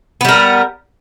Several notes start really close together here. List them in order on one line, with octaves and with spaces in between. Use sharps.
B3 G3 A#4